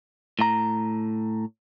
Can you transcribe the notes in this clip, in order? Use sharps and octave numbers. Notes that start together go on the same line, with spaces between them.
A2 A#5